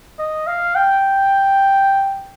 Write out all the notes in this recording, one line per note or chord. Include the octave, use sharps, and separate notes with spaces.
D#5
F5
G5